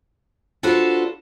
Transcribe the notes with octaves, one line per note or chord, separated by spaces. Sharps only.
D4 F4 F#4 A4 B4 C5